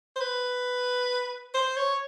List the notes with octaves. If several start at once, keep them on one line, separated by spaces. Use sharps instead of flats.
C5
B4
C5
C#5